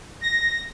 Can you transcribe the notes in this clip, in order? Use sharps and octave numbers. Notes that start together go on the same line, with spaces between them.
A#6